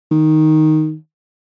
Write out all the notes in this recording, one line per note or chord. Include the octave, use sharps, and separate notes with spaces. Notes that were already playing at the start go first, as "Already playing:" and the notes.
D#3